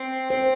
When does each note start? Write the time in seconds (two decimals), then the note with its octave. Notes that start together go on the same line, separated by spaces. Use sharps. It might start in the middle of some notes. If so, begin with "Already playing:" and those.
Already playing: C4
0.30 C4 C5